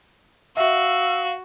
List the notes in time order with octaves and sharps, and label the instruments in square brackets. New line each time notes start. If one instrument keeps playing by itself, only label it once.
[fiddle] F#4 [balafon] E5 [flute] F5 [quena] E6